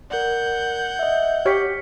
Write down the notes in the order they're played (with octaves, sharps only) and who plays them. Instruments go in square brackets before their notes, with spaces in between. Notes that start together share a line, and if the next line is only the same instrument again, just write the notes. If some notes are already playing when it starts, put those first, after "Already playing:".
[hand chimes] A#4 D5 [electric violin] F#5 G6
[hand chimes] D#5 E5
[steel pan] G4 C#5 [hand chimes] F6 B6 C#7